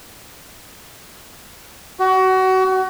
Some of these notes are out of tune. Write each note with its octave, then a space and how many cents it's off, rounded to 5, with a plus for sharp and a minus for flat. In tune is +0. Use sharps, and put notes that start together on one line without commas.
F#4 +25